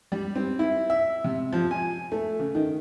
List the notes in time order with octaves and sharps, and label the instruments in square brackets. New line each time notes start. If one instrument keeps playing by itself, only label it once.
[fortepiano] G3
C4
E4
E5
C3
F3
G#5
A3
C#3
D#3